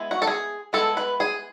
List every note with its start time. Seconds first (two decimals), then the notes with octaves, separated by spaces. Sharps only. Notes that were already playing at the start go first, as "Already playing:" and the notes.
Already playing: G#3 B3 E4
0.11 F#4
0.22 A4
0.27 G#4
0.73 G#3 B3 E4 A4
0.97 B4
1.20 G#4